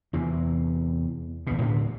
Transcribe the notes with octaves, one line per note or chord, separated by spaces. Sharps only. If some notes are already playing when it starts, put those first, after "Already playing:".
E2 C3
G#1 B2
A2 D3 D4